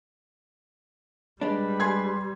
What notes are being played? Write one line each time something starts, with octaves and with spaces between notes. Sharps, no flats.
G3 G#3 D4 B4
G#5 C6 G#6